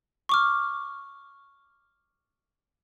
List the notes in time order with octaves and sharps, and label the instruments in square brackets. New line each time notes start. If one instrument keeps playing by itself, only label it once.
[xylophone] C#6 D6 F6